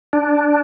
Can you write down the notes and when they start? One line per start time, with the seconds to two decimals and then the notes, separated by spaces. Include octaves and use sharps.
0.13 D4